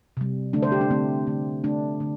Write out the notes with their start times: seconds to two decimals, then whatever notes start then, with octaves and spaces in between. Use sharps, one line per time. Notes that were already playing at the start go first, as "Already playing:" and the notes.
0.17 C3 G3
0.53 D3 A3 D4
0.63 C5
0.72 G4
0.81 D4
0.90 D3 A3 C4
1.27 D3 A3
1.64 D3 A3 D4
2.00 D3 A3